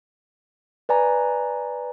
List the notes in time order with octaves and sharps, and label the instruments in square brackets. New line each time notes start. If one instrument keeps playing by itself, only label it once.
[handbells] B4 D5 G#5 A#5